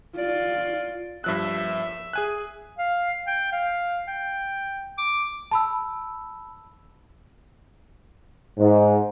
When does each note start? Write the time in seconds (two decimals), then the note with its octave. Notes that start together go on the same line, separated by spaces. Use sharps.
0.18 F4 D5
1.24 G2 F3 E5 F#6
2.13 G#4 G#5 F#6
2.78 F5
3.27 G5
3.52 F5
4.08 G5
4.98 D6
5.51 A5 B5 E6
8.58 G#2